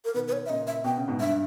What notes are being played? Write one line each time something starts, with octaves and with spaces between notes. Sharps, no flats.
A#4
B2 D#3 B4
B4
C#5
E5
A#2 C#3 D#5
E5
B2 G5
C#3
G#2 B2
G2 E5